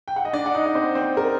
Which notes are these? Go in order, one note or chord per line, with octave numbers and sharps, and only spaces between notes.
G5
F#5
D#5
D4 D5
F#5
D#4 D#5
D5
C4 C5
C4 C5
A#4